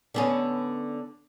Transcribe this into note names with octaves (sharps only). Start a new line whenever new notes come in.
D3 B3 C#4